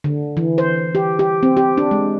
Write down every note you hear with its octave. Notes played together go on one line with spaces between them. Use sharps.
D3
E3
C5
G4
G4
C4
G4
D4
G#3